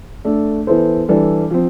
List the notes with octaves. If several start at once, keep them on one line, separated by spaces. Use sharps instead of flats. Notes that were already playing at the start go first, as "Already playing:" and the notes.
A3 D4 A4
E3 B3 E4 A4 C5
E3 G3 D4 A4
F3 C4